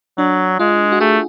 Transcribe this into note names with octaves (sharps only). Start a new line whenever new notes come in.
F#3 D4
G#3 F4
F#4
A3 G#4